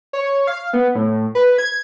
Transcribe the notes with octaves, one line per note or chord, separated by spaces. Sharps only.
C#5
F5
B3
A2
B4
G#6